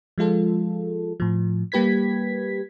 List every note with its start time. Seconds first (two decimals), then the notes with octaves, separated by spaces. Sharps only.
0.18 F3 G#3 F4 A4
1.20 A2 F3
1.72 G3 A#3 G4 B4 G#6 B6